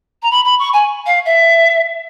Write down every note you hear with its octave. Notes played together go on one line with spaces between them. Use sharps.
A#5
B5
B5
C#6
G#5
F5
E5